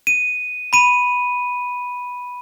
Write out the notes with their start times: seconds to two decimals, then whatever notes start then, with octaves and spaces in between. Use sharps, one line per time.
0.07 D#7
0.73 B5 D#7